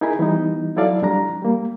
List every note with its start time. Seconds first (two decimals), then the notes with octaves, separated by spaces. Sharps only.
0.01 D#4 E4 G#4 A#4 G#5 B5
0.19 E3 G3 B3 D#4
0.76 F#3 E4 A4 D5 F5
1.02 F2 G3 D4 A#5
1.42 G3 A#3